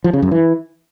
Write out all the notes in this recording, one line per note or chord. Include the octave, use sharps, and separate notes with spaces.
F3
C#3
F#2
E3